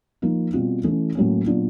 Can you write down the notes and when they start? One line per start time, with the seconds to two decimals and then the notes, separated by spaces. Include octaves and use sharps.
0.22 F3 A#3 D#4
0.53 B2 G3 C4 F4
0.84 E3 A3 C#4
1.15 A2 F#3 A#3 C#4
1.46 A#2 F#3 B3 D4 F4